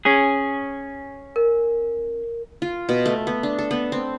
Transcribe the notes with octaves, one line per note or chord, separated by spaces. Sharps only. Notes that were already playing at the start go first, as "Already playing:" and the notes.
C#4 G#4
A#4
F4
B2
A3
B3
D4
A4
B3
C4